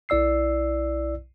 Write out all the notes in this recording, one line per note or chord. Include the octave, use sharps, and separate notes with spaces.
B1 E4 D5 E6 C7